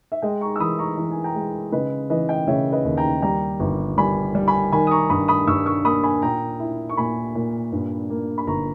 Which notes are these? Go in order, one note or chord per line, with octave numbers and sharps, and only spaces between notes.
E5
G#3 D#5 G5
A#5 C#6
E6
E3 B5 D#6
A#5 C#6
E3 A#5
G#5
G5 A#5
G#3
C#3 B4 D#5
E3 B4 D#5
D#5 G5
C#3 C#5 E5
B4 D#5
D#2
G5 A#5
G3 G5 A#5
G1
G3 G#5 B5
G3
G#5 B5
D#3 G#5 B5
D#6
A#5 C#6
G2 B5 D#6
B5 D#6
G2 C#6 E6
C#6 E6
A#3 B5 D#6
G#5 B5
A#2 G5 A#5
E4
C#6
A#2 G#5 B5
A#2
G2
A#3
B5
G1 A#5 C#6